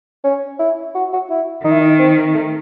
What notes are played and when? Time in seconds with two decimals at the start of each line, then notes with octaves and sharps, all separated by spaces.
0.24 C#4
0.59 E4
0.95 F#4
1.13 F#4
1.30 E4
1.64 D#3 D#4
1.72 E4
1.81 D#4
1.99 C4
2.34 A3